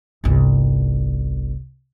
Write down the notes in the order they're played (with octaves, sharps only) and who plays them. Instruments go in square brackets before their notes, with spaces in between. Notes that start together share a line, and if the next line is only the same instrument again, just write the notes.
[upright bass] G1 C2